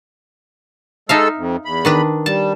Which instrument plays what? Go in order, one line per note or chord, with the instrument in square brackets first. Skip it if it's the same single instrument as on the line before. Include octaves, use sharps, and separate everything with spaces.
[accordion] G#3 A4 E6 [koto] D#4 E5 F5
[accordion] F2
E2 B5
[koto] D#3 D4 B4
[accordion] G3 [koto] A5